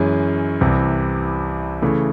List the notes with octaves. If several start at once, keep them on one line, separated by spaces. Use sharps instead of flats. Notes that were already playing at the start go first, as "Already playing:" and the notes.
Already playing: F#2 E3 G#3 C#4
C2 C3 E3
C#3 E3 A3